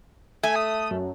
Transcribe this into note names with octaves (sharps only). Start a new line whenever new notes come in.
A3 G#5
D#6
F#2